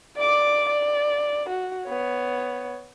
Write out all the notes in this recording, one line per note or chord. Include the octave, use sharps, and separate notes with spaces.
D5 D6
D5
F#4
B3 C#5